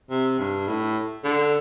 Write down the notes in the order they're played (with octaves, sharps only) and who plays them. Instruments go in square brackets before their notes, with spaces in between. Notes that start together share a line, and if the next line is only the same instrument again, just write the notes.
[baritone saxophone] C3
G2
A2
D3